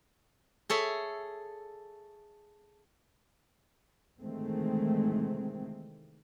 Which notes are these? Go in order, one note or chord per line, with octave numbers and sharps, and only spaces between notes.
G#4 A4 C#5 E5
C3 D#3 E3 G#3 A3 C4